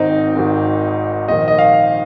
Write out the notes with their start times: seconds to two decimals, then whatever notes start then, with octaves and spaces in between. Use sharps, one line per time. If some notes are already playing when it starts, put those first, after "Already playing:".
Already playing: G#1 G#2 D#3 C4 D#4
0.35 G#1 G#2 D#3
1.28 A#1 G#2 D#3 D#5
1.48 D#5
1.59 F5